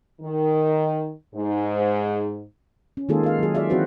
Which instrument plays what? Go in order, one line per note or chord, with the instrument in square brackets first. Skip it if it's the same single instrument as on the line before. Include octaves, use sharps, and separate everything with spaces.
[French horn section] D#3
G#2
[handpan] C#4
D#3 G#3 A#3 F4 G#4 A4
F4 F5
F#3 G#4
F4 G#4 D5 E5 F5
E3 C4 F#4 B4 C5